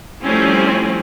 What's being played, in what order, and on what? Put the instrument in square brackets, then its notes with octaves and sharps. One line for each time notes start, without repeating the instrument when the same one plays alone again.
[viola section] F3 G3 A3 C4 C#4 E4